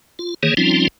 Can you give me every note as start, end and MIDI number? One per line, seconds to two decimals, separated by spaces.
0.19 0.34 65
0.43 0.54 51
0.43 0.54 52
0.43 0.54 58
0.43 0.54 68
0.43 0.54 73
0.57 0.88 53
0.57 0.88 55
0.57 0.88 60
0.57 0.88 61
0.57 0.88 63
0.57 0.88 65